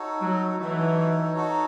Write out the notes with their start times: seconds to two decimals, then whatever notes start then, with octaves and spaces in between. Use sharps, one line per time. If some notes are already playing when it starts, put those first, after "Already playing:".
Already playing: D#4 F#4 A4 C#5
0.21 F#3
0.59 E3 D#4 F#4 A4 C#5
1.34 D#4 F#4 A4 C#5